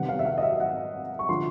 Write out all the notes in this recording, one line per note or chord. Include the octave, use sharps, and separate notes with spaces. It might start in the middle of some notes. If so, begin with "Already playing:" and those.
Already playing: C3 D#3 G3 B3 F#5
F5
E5
F5
D#5
E5
F#5
C#6
D3 F3 C6